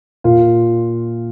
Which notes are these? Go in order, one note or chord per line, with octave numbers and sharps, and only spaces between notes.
A#2 F4